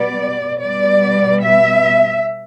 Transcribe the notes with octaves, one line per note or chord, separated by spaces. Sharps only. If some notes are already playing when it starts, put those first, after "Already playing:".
Already playing: B2 G3 B3 D5
B2 G3 B3 D5
E5